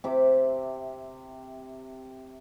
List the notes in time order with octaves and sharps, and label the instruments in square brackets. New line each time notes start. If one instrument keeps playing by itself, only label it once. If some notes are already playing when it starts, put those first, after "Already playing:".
[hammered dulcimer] C3 E5 D6